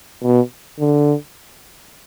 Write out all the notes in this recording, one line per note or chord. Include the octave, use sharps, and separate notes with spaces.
B2
D3